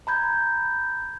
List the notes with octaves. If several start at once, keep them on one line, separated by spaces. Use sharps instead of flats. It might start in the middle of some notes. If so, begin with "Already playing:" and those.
A#5 B5 G6 G#6